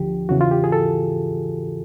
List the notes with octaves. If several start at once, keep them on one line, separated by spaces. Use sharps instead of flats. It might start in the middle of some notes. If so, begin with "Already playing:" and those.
Already playing: D2 D3 F3 G4
E2 C#3 E3 F#4
F4
G4
G#4
A4